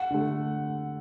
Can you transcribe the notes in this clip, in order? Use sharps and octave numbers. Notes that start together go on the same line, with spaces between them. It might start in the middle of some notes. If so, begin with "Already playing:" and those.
Already playing: F#5
D3 A3